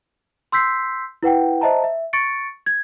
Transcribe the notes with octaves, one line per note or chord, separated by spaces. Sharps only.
C6 E6 G6 B6 C7
E4 B4 F#5 G5
C5 D#5 E5 A5 A#5
E5
C#6 A6 C#7 D7
G#6